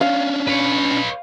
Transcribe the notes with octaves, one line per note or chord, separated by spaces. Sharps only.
C#4 D4 F5
B4 C#5